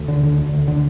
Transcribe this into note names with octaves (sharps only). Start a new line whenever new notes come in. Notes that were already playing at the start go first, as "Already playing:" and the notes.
Already playing: D2
D3
D3
D2
D2
D3